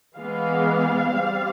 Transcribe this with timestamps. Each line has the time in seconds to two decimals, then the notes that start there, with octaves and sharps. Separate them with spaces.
0.17 E3 G#3 B3 F5
1.13 G3 C4